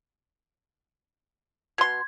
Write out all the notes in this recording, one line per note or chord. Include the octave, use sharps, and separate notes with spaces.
B2 C6 G#6